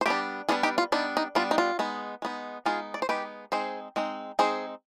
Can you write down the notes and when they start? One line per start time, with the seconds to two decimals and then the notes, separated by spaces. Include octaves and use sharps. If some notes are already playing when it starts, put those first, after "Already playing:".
0.01 C5
0.06 G3 B3 D4 G4 B4
0.49 G3 B3 D4 F4 G#4
0.63 D#4 G4
0.78 F4
0.92 G3 B3 D4 D#4
1.17 D#4
1.35 G3 B3 D4 F4
1.51 D#4
1.58 F4
1.79 G#3 B3 D#4
2.22 G#3 B3 D#4
2.66 G#3 B3 D#4 F4 G#4
2.94 D5
3.02 C5
3.09 G#3 B3 D#4 G4 B4
3.52 G#3 C4 D#4 G#4 C5
3.96 G#3 C4 D#4
4.39 G#3 C4 D#4 G#4 C5